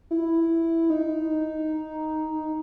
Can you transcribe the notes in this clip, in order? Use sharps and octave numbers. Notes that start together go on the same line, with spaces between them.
E4
D#4